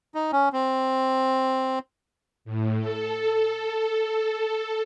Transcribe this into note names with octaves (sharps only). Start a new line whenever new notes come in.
D#4
C#4
C4
A2
A4